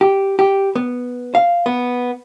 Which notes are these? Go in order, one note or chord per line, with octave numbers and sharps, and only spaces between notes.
G4
G4
B3
F5
B3